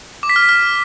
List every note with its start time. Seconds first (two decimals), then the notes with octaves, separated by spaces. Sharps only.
0.23 D6
0.29 B6
0.36 F6
0.42 B6
0.49 F6